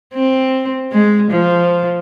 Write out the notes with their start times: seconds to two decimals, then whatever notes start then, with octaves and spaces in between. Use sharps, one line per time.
0.14 C4
0.92 G#3
1.31 F3